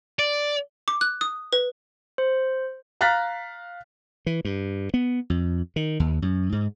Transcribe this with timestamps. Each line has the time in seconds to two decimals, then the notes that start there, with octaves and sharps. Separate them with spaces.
0.19 D5
0.88 D6
1.01 F#6
1.21 D#6
1.53 B4
2.18 C5
3.01 F5 A#5 F6 F#6 A6 B6
4.26 E3
4.45 G2
4.94 B3
5.30 F2
5.76 D#3
6.00 D#2
6.22 F#2
6.52 G#2